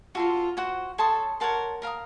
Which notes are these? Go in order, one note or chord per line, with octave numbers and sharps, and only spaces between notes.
F4 F#4 A4 C5
F#4 C5 F#5
A4 C#5 A5 C6 D#6
A#4 C#5 F#5 A5 C6
A#4 F5 A#5 D#6